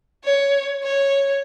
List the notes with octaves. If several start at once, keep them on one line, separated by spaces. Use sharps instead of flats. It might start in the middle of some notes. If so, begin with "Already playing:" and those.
C#5
C#5